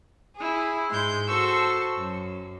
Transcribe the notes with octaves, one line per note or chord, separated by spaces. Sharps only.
E4 G#4
G#2 G#3 C6 G6
F#4 A4 C5 C6 C#6 E6
F#2